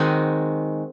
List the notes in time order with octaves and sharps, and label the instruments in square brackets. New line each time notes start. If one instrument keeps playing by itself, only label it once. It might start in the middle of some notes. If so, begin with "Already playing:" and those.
Already playing: [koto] D#3 G#3 C4 D#4 F#4